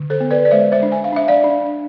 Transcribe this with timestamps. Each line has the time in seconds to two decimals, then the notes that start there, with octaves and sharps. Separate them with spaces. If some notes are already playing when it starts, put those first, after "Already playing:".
Already playing: D3
0.10 A4 C5
0.20 B3
0.31 B4 D5
0.45 D5
0.51 G#3 C5 E5
0.72 C5 E5
0.83 D4
0.92 G#5
1.04 F5
1.12 D4 E5
1.28 D5 F5
1.44 D4